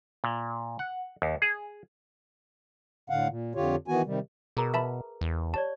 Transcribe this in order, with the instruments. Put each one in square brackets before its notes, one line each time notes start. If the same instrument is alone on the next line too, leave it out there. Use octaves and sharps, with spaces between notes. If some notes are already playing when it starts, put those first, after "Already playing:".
[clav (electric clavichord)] A#2
F#5
D#2
G#4
[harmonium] A2 D3 F5 F#5
A#2
F2 D3 F4 G4 C#5
D#3 E3 B3 F#4 G#5
C3 D#3 G3
[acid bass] B2 [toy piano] G#4 A#4 A#5
[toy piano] B4 [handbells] E5 A5 B5
[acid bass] E2
[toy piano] G4 C#5 D5 [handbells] A5